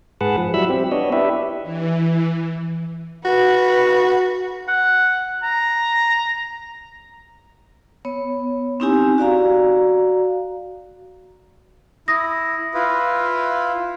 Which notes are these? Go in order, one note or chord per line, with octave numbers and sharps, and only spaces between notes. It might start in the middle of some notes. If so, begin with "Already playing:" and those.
G#2 G#4 B4 F#5 A5
F3
F#3 G3 E4 B5 E6
C4 G4
B3 D4 C#5 D#5
D4 E4 G4 B4 E5
E3
F#4 B4 F#5
F#5
A#5
B3 C#5
C4 C#4 D#4 E4 G4 G#5
F#4 D5 F5 A#5
E4 D#6 A#6
E4 F4 B4